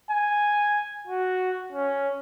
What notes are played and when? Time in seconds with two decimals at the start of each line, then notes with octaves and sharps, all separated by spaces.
0.11 G#5
1.08 F#4
1.72 C#4